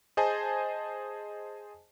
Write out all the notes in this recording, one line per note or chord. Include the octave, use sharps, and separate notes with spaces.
G#4 C5 D#5 G#5 A5